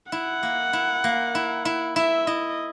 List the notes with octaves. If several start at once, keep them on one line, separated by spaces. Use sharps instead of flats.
E4 F#5
A#3
E4
A#3
E4
E4
E4 E5
E4 D#5